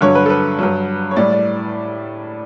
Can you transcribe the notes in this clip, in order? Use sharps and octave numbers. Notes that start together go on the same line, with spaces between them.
G2 D3 F#3 C#5
B4
A4
B4
G2 F#3
C#5
A2 G3 D5
D5